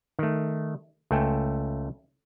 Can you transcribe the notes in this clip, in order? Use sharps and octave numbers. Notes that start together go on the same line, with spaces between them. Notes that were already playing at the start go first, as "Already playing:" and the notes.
D#3 A3
C#2 A3 A4 G5 G#5